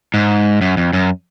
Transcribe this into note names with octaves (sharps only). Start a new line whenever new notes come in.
G#2
F#2
F2
F#2